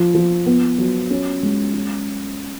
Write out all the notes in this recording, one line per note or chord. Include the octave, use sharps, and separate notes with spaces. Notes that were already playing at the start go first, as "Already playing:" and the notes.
Already playing: F3
F3
B3
F#3
C#4
G#3
C#4